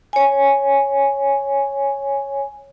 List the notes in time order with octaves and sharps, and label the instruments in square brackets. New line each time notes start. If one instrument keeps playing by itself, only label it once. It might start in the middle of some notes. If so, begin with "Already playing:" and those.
[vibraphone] C#5 G#5